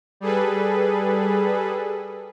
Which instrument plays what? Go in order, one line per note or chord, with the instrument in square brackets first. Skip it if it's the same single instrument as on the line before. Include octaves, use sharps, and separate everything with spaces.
[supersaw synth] G3 G#4 A4 B4